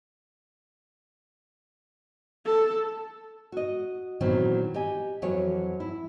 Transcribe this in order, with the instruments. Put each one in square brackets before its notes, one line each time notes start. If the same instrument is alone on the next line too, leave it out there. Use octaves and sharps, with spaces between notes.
[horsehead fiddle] A4
[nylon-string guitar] F#4 D#5
A#2 D#3 E3 F#3 B3 C4
G4 D#5 G#5
F2 E3 F#3 F#4 C#5
E4